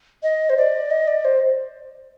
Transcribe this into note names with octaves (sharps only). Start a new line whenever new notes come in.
D#5
C5
D5
D#5
D5
C5